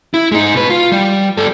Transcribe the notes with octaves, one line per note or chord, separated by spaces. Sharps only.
E4
G#3 D#4
B2 B4
F4
G3
G3 A4